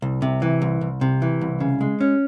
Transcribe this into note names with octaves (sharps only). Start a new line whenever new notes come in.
C2
C3
E3
C2
C2
C3
E3
C2
C#3
G#3
C#4